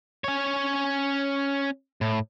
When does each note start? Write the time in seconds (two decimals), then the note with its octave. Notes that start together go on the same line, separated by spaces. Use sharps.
0.24 C#4 C#5
2.01 A2